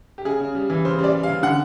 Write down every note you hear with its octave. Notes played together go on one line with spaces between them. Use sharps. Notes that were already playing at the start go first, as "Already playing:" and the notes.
G4
C#3 G#4
C#3
G3
E3
C#3 C5
G3
D5
G3
F5
C#3
D3 F#5